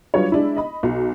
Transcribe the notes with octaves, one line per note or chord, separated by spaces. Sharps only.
F#3 G3 D4 F4 B4 C#5
G#3 D4 E4
D#5 B5
B1